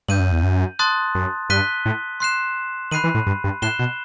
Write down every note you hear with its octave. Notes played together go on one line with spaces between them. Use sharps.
G2 G6 D#7 F#7
F#2
E2
F#2
A5 C6 D#6 F#6 A6
F#2
G2 F#6 B6 D#7 G7
A2
C6 F#6 C7 E7
D#3 B5 F#6 C7 D#7 F#7
E3
A2
G2
G2
A2 F#6 C7 E7 G7
B2